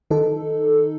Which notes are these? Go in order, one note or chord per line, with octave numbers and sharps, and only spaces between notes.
D#3 D#4 A4